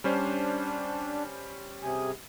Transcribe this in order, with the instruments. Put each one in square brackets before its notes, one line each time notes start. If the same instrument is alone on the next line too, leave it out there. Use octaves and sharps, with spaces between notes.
[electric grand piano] G3 C#4 C5 [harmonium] D4
[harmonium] C3 G#4